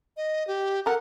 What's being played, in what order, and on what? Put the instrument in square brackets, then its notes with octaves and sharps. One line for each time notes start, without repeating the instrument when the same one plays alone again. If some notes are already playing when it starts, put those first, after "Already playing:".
[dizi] D#5
G4
[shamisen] A4 A#4 [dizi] F#5